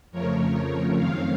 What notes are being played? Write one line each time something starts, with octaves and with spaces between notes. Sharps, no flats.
F2 C#3 F3 A3 A#4 C#5
F#2 D#3 A3 C4 C#5 F5